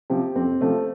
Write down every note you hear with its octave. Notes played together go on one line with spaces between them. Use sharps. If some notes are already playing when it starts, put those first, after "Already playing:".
C3 F3 G4
F2 C4
C3 F3 A3